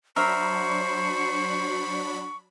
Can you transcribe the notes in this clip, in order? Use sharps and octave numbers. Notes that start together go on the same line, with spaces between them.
F#3 D4 A#4 C5 E5 B5 C#6